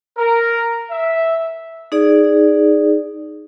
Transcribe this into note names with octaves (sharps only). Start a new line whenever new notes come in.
A#4
E5
D#4 G#4 D5